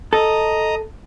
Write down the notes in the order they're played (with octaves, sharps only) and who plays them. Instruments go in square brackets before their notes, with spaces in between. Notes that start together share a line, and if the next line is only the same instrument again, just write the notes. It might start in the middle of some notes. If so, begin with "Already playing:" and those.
[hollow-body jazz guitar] A4 [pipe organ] D#5 A#5 D#6